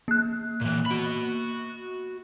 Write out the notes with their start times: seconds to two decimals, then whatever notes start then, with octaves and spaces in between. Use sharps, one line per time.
0.08 A#3 F#6
0.61 A#2 E3
0.86 F#4 B5